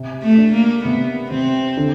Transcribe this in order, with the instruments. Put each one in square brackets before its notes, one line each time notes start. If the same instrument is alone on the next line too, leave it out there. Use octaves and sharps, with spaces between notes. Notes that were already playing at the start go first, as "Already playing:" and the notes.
Already playing: [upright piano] C3
[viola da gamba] A3
[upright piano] D4
[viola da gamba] A#3
[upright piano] C3 [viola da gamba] B3
[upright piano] C3 [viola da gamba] C4
[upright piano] D3